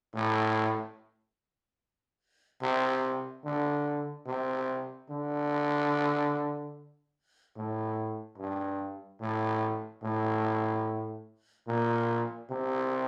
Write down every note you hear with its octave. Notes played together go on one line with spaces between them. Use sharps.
A2
C3
D3
C3
D3
A2
G2
A2
A2
A#2
C3